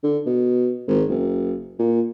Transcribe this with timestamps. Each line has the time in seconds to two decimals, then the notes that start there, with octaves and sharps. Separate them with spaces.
0.03 D3
0.26 B2
0.87 G#1
1.09 F#1
1.79 A#2